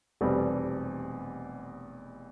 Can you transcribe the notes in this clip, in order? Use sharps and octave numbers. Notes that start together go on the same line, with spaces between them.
F1 E2 B2 G3 C4